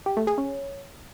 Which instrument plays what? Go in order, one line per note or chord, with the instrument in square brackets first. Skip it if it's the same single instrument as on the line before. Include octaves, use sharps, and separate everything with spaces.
[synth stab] G4
A3
G#4
C#4